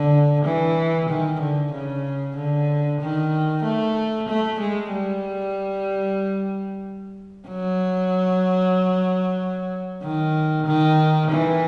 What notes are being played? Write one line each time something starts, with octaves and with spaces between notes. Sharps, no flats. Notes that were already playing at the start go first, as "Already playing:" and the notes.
Already playing: D3
E3
D#3
D3
C#3
D3
D#3
A3
A3
G#3
G3
F#3
D#3
D#3
E3